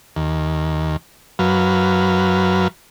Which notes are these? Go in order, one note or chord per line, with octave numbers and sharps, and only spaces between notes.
D#2
F#2 F#3 B4 F5